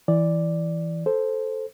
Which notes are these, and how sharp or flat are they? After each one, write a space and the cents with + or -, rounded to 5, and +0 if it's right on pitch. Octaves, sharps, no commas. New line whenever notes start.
E3 +0 D5 +0
A4 -5 C5 +0